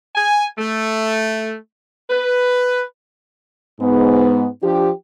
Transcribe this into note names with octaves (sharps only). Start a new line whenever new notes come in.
G#5
A3
B4
G#2 B3
F3 D4 G4